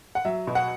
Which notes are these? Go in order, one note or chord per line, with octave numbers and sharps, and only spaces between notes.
F#5
F#3 E5
B2
F#5